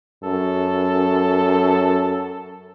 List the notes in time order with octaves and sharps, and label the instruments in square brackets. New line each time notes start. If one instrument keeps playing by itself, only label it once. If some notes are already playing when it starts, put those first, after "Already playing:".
[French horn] F#2 [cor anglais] A4